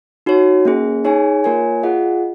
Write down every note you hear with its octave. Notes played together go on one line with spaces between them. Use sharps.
D#4 F#4 C#5
A#3 C#4 G#4
D#4 G#4 C#5 G#5
A#3 F4 A#4 C#5 G#5
F4 G#4 D#5 F#5